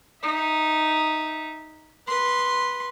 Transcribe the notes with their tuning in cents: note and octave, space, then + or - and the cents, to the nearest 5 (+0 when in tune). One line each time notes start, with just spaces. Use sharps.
D#4 +0 E5 -15
B4 -10 C6 +0